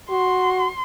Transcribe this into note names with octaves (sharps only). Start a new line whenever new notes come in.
F#4 C6